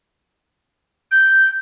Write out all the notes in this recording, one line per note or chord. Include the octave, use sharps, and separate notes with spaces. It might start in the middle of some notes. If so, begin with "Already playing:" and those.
G6